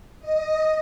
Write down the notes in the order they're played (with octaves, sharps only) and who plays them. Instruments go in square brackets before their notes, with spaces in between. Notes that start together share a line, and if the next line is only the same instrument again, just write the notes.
[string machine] D#5